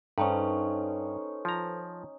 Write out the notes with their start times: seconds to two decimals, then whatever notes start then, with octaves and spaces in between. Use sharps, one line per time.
0.18 G2 C#4 D#4 A4 B4 C5
1.45 F3 A#5